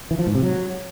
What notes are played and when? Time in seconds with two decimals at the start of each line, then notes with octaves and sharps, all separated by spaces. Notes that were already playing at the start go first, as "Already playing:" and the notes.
0.11 E3
0.19 F3
0.27 G#2
0.35 C3
0.43 F#3